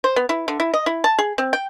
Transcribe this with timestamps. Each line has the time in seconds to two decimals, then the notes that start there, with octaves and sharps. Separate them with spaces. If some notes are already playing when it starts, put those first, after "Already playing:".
0.04 C5
0.16 B3
0.29 E4
0.48 D3
0.60 E4
0.74 D#5
0.86 E4
1.04 A5
1.18 G#4
1.38 C4
1.53 G5